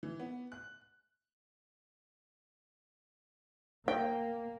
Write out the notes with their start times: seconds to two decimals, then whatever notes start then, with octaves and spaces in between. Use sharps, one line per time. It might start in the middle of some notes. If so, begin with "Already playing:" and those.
0.03 E3
0.20 B3
0.52 F#6
3.88 A#3 G5